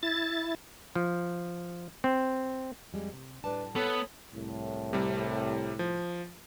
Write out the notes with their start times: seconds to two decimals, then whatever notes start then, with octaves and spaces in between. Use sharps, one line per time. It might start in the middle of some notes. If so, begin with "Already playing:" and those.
0.03 E4 A6
0.95 F3
2.04 C4
2.93 F2 G3 G#3
3.13 C3
3.44 A2 G3 D4 B4 A5
3.76 B3 A4 C#5
4.34 C2 A2
4.93 C3 G3
5.79 F3